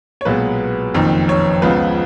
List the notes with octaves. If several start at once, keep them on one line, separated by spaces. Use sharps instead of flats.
C#5
B1 A#2 G#3 B3 B4
F#1 F2 D#3
C#5
C#2 C#3 F3 B3 B4